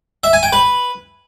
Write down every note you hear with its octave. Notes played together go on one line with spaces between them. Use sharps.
E5
G#5
G5
B4